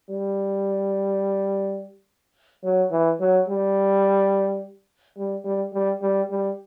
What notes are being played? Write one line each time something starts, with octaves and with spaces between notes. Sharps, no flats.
G3
F#3
E3
F#3
G3
G3
G3
G3
G3
G3